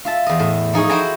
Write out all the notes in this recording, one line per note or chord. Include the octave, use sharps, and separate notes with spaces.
F4 E5 A5
E2 D#5
A2
F3 D#4 G#4 C#5
E4 F#4 C5 G5 G#5 A#5